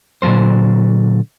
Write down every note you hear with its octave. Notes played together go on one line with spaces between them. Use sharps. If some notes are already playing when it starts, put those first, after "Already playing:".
A#2 D3 F#3 A#3 C5